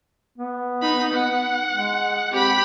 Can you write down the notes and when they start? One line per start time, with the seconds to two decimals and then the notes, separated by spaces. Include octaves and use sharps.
0.38 B3
0.82 D#4 B5
1.13 F#5
1.73 G#3
2.32 C4 G4 B5